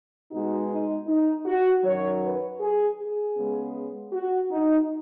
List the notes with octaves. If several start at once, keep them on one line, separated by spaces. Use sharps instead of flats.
B2 G#3 B3 D#4 F#4
D#4
D#4
F#4
F#2 D#3 F#3 C#5
B4
G#4
G#4
C#3 G#3 B3
F#4
D#4